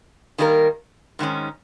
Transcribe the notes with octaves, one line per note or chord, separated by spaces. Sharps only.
D#3 G3 A#3 D#4 A#4
G#2 D#3 G#3 C#4